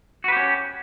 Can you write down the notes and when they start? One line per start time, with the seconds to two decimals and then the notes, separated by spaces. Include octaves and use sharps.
0.24 F#4
0.28 B4
0.32 G4
0.36 C#4